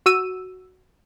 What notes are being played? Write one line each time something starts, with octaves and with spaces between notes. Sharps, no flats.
F#4 E6 D#7